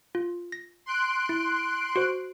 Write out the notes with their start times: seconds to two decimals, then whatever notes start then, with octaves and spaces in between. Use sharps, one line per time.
0.15 F4
0.52 A#6
0.86 C6 F#6 D7
1.29 E4
1.96 F#4 C5